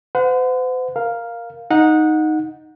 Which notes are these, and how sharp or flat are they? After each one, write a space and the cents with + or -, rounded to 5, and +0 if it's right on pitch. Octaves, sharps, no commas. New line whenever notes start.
C5 -45 F#5 -25
A#4 +5 F5 +0
D#4 +0 F#5 -20